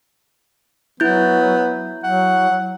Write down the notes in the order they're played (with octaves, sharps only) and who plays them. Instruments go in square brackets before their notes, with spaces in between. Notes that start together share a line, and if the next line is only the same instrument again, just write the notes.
[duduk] F#3 [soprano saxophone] B3 [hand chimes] E4 G6
[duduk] F#3 [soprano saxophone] F#5